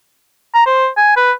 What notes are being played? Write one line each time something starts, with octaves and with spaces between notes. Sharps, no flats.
A#5
C5
G#5
B4